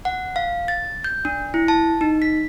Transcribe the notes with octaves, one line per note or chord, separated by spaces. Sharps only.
F#5
F5
A6
G6
D4
E4
A5
D#4
B6